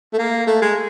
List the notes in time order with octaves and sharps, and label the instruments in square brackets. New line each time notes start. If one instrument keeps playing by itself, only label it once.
[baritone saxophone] A3
A#3
A3
G#3